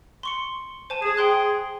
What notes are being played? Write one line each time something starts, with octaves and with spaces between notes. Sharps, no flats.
C6 C#6 C#7
C5 G#5 A5
G#4 A5
G5 C6 F#6